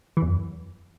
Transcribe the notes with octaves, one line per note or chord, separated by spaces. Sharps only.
E3
E2
F#2